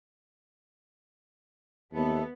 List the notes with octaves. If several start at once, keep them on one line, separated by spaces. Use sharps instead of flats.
D#2 A3 B3 A4